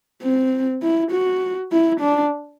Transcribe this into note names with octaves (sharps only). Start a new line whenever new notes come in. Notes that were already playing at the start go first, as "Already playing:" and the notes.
C4
E4
F#4
E4
D4